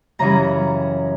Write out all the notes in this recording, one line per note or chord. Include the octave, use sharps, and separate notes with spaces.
F#2 C#3 E3 G3 A#5